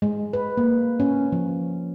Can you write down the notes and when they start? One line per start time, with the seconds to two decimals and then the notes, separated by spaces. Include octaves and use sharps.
0.02 G#3
0.33 B4
0.57 A#3
1.00 C#4
1.32 F3